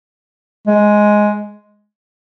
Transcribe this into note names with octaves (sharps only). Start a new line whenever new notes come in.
G#3